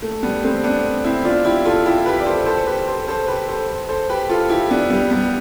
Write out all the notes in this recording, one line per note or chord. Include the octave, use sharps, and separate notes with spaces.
A3
G3 B3
A3 C4
B3 D4
C4 E4
D4 F4
E4 G4
F4 A4
E4 G4
G4 B4
D5
A4 C5
A4 C5
G4 B4
A4 C5
A4 C5
G4 B4
A4 C5
A4 C5
G4 B4
F4 A4
E4 G4
B3 D4
G3 B3
G3 B3